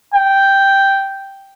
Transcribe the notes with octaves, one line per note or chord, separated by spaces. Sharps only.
G5